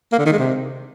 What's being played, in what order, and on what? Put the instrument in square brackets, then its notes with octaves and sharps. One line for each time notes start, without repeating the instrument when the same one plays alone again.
[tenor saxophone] A#3
D3
D#3
G#3
C3